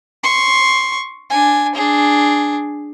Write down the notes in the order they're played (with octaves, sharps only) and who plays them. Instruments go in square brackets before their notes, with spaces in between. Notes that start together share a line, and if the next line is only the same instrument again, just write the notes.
[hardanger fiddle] C6 C#6
D4 G#5
D4 G#4